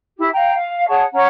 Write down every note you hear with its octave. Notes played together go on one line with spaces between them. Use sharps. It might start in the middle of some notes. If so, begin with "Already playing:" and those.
E4 G4
F5 G5 A#5
F5
G#4 C#5 F#5 A5
C#4 C#5 F#5 A#5